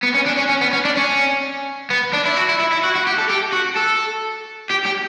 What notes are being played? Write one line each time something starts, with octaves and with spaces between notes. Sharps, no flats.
B3
C#4
D4
C#4
C#4
B3
C#4
D4
C#4
B3
D4
E4
F#4
E4
E4
E4
F#4
F#4
G4
A4
G4
F#4
A4
G4
G4